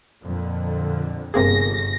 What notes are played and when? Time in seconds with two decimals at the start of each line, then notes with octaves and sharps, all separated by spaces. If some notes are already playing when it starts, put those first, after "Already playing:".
0.22 F2 A#2 D3
1.34 G1 C3 A#3 G#4 A#6